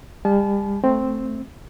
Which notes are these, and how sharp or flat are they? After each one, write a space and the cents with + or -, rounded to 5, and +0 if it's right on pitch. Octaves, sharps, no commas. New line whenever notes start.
G3 +35 A5 -35
A3 +0 C4 +0